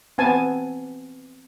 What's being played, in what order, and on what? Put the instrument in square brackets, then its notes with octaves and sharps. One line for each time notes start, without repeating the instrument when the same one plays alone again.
[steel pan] B3 C4 G#5 A5